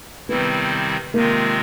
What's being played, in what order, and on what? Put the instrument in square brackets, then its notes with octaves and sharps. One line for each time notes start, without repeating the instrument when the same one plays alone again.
[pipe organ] C3 D#3 G3 C4 E4 [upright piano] B3
[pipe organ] C3 D#3 G#3 C4 F4 [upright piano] A#3